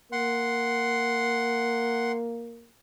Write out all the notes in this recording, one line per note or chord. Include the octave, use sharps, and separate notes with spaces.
A#3 F#5 C6